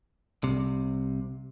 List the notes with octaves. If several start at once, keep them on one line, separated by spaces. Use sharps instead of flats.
C2 C3